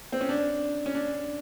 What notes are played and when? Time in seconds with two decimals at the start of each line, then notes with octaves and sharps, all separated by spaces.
0.12 C4
0.21 C#4
0.29 D4
0.86 C#4
0.95 D4